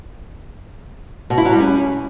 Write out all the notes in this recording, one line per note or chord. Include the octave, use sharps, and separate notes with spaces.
B2
E4
F#3
G3
C#4